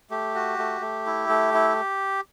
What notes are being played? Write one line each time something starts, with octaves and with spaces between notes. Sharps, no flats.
A3 G4
F#4
A3
A3
E4
A3
E4